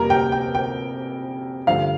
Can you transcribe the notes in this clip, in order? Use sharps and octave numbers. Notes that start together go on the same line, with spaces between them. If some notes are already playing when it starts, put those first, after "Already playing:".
Already playing: F2 C3 G3 A#3 A#4
G5
G5
G5
G2 D3 F3 A3 F5